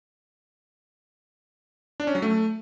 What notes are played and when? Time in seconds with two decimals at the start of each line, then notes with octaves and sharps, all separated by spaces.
2.00 D4
2.07 C#4
2.15 F#3
2.22 A3